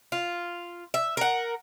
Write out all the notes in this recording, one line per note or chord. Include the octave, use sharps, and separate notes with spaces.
F4
E5
A#4 F#5